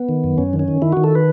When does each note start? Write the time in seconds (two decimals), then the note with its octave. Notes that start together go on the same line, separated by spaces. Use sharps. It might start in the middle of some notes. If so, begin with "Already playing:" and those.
Already playing: B3
0.09 D#3
0.24 F#2
0.38 F#2 C#4
0.53 D#3
0.59 C#4
0.68 D#3
0.82 D#3 E4
0.93 D#3 F#4
1.04 A4
1.15 B4